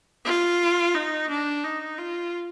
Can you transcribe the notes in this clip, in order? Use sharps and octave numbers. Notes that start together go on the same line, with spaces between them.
F4
D#4
D4
D#4
F4